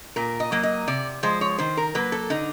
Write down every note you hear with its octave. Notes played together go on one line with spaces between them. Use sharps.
A#2 A#4
D#5
F#3 A#3
D#5
C3 D5
F3 G#3 C5
C#5
D#3 C5
A#4
F#3 A#3 B4
A4
D3 D#4